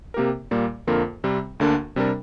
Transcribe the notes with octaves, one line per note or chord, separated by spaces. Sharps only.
C3 A#3 G4 A#4
A#2 G3 A#3
F2 D3 A#3 F4 A#4
C3 G3 C4
D2 D3 A#3 D4 A#4
C3 G3 D4 A#4